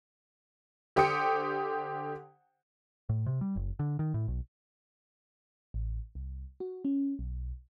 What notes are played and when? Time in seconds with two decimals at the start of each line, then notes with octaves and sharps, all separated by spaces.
0.96 D3 G4 C5 G5 D#6 C#7
3.09 A2
3.26 C3
3.41 G3
3.56 F#1
3.79 D3
3.99 D#3
4.14 A2
4.28 B1
5.74 A1
6.15 C2
6.60 F#4
6.85 C#4
7.19 B1